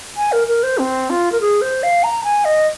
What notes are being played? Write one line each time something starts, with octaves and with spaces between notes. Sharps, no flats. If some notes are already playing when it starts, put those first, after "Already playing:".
G#5
A#4
A#4
C5
C4
F4
A#4
G#4
C5
F5
A#5
G#5
D#5